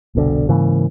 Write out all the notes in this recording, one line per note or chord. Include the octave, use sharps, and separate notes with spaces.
F1 C2 B2 D3
G#2 C#3 E3 A#3